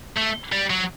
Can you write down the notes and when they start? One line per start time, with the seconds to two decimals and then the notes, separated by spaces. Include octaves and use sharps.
0.17 A3
0.52 G3
0.70 F#3